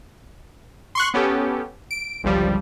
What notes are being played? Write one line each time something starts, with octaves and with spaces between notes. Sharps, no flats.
C6 C#6 F#6
B3 C#4 G4 A4
D7
G1 C#2 F3 G3